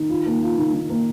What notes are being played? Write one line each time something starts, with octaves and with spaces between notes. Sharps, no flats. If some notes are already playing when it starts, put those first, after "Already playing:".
Already playing: D#3
F4
A#3
F4
D#3
D#3
A#3